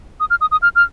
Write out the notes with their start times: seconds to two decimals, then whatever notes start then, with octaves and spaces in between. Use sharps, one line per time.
0.20 D#6
0.30 F6
0.41 D#6
0.52 D#6
0.62 F6
0.76 F6